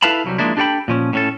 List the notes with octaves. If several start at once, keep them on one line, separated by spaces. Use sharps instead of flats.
E4 A4 B4 F5 A5 B5
C2 F#3 G3
F3 F#3 G#3 A#3 D4 E4
D4 G4 A4 C5 G5 B5
A#2 F3 C#4
A2 C#4 A4